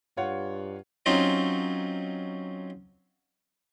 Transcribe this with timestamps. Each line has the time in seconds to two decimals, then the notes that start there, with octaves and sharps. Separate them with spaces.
0.17 G2 F4 C#5 F#5
1.06 F#3 C4 C#4 D#4 F4